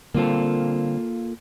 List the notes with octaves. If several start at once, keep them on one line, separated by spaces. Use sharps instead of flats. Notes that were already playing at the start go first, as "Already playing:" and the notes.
D3 G3 A#3 C4 F4 A4